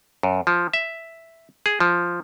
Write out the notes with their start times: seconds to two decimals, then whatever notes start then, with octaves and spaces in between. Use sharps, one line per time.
0.23 F#2
0.47 F3
0.73 E5
1.66 G#4
1.80 F3